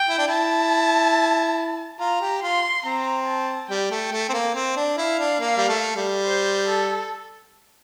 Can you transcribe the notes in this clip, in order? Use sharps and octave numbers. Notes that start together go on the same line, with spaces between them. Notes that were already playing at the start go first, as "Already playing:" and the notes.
Already playing: G5
E4
D4
E4 A5
F4 A#5
G4
F4 C6
C4 A#5
A5
G3 G5
A3
A3
C4
A#3
C4
D4
E4 F5
D4
A#3
G3
A3
G3
C5
A4